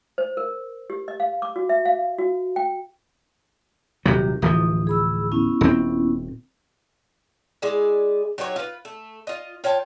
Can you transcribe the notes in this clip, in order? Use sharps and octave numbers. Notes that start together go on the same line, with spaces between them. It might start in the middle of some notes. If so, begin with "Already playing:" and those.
C5
A#4
G4
D#5
F5
D6
F#4
E5
F5
F#4
G5
D#1 C3 F#3 G4
D1 E3 F3 D#6
G#4 B5 E6
B3 C#4 E4
D#1 C4
G#3 E4 G#4 D5
F#3 D#4 G4 C#5
F4 B4
A3
F4 D#5
F4 C#5 G5 A5